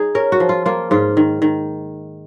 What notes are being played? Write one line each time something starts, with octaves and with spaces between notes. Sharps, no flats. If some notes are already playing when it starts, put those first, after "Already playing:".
Already playing: D#4 G#4 C#5
C#4 A#4
F#4
F3
F4
A#3 F4
G#2 F4
D#3
D#3